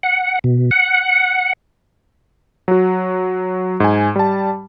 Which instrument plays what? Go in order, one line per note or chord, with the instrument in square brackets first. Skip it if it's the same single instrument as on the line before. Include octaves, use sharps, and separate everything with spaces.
[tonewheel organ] F#5
B2
F#5
[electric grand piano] F#3 F#4
G#2 G#5
G3 A5